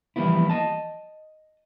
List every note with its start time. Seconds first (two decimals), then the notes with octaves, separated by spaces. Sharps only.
0.16 E3 F3 G3 A#3 B3 E4
0.50 D#5 A5